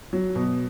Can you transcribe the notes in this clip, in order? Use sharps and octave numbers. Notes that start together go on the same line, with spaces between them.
F#3
B2